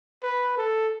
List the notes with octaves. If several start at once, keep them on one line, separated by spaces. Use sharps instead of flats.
B4
A4